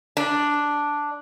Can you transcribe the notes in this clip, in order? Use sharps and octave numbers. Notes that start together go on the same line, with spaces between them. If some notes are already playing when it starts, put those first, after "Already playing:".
D4